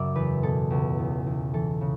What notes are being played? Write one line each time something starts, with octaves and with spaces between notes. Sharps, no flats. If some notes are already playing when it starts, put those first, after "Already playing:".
Already playing: F#2 C#3 G3 D5 E5
E2 B4
B2 A4
C#2
E2
E2
E3 A4
C#3